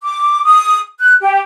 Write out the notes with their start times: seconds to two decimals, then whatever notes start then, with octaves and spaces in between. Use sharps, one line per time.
0.03 D6
0.45 D#6
1.01 F#6
1.20 G4